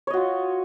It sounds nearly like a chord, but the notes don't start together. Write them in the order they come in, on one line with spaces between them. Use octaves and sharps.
C#5 D#5 F#4 F4